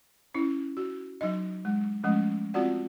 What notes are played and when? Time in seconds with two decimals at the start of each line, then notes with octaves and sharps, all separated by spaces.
0.34 C#4 E4
0.77 F#4
1.21 F#3 D#4 D#5
1.65 G#3
2.03 F3 G#3 A3 C#4
2.54 C4 F4 F#4 D5 F#5